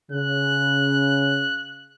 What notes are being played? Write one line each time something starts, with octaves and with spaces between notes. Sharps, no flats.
C#3 F#6